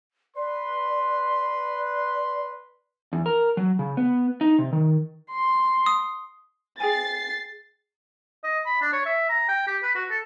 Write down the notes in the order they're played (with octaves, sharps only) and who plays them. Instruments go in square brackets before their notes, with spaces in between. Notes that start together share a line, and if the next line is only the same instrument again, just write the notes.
[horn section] B4 C6 [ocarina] D5
[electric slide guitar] E2
A#4
F#3
C#3
B3
D#4
C3
D#3
[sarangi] C6
[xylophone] D#6
[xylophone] G#4 G5 G#5 [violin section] A6 C7
[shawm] D#5
B5
D4
C#5
E5
A#5
G5
G4
B4
F#4
A4